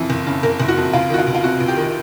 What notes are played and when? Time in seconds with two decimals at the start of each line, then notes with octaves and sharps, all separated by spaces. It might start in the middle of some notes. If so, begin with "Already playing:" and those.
Already playing: F2 C#3 E3
0.10 F#1
0.27 C#3
0.43 F#1 A#4
0.60 F#1
0.68 F#4
0.77 F2
0.93 C#2 F4
1.10 D#3 F#4
1.18 F4
1.27 C#2
1.34 F4
1.44 C3 F#4
1.60 C#2
1.68 G4
1.77 D#3